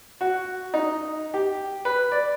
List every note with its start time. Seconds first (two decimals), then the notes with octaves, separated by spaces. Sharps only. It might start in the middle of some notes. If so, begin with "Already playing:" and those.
0.21 F#4
0.74 D#4
1.34 G4
1.85 B4
2.12 D5